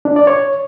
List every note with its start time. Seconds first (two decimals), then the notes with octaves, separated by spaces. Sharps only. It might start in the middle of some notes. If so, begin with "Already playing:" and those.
0.05 D4
0.16 D5
0.27 C#5